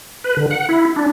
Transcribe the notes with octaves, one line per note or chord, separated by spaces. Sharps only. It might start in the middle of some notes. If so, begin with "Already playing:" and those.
B4
D3
F#5
E4
D4